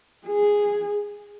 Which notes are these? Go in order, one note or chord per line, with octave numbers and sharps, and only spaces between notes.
G#4